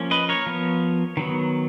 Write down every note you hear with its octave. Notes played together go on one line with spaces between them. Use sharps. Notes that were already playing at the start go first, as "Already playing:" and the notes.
Already playing: F3 A#3 C#4
B4 D#5
A#4 C#5
F3 B3
D#3 F#3 B3